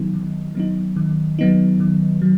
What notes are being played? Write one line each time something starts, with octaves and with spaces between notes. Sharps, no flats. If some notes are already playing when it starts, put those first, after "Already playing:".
Already playing: D#3 F#3 B3 D#4
D#3
F#3 B3 D#4
D#3
F#3 B3 D#4
D#3
F#3